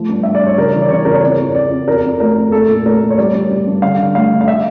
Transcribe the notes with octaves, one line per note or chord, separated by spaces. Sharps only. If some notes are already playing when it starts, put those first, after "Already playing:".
Already playing: F3 A3
G2
G2 E5
D5
G2 C#5
C#3 A#4
E3
D5
C#3 C#5
E2 A#4
C#5
F2 D5
F2
F2 D5
F2
F2 A#4
F2
A3 A#4
F2
A3 A4
A#2
A3 A#4
A3
C#5
G3 D5
G3
G3
G2
D3 F5
D3
A3 F5
D3
F5
E5